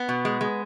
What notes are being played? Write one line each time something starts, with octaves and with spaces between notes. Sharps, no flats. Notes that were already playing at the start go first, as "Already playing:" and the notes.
Already playing: B3
B2
G#3
G#3